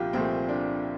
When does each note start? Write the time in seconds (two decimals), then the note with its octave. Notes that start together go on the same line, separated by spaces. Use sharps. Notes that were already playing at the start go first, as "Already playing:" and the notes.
Already playing: C2 A#2 F3 F4 G4
0.13 C2 A#2 F3 A3 C4
0.49 D4